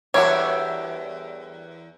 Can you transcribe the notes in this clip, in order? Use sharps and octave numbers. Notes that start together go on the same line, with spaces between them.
E2 G3 D4 F#4 A#4 C#5 E5